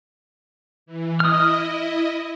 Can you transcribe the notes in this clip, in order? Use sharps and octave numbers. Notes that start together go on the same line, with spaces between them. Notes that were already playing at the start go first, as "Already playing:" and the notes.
E3
E4 D#5 D#6 F6